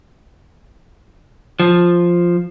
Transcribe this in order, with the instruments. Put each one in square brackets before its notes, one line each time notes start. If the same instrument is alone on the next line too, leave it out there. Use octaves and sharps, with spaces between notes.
[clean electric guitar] F3